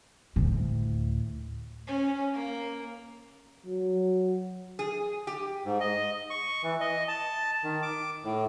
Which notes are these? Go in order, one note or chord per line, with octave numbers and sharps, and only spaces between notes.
D2 A2
C#4
A#3
F#3
G#4
G4
G#2
D#5
C#6
E3
D#5
A5
D#3
D6
A2